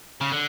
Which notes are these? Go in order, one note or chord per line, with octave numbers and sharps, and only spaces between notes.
C#3
D3